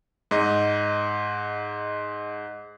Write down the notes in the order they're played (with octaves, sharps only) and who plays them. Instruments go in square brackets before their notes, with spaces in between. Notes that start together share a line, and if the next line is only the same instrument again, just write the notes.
[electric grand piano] G#2 D#5